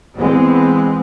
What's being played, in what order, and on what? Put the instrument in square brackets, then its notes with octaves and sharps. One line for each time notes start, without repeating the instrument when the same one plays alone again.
[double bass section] E3 G#3 B3 C4